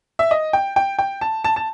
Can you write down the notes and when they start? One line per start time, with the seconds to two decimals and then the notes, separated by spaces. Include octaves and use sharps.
0.19 E5
0.31 D#5
0.53 G5
0.76 G5
0.99 G5
1.21 A5
1.44 A5
1.56 A5